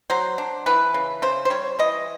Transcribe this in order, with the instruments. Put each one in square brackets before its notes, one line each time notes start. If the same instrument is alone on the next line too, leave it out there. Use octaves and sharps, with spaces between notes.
[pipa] F#3 C5
D4
E3 B4
C#3
C#3 C5
C5
G3 C#5
E3 D#5